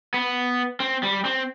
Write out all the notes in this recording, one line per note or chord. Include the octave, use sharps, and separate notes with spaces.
B3
C4
G3
C4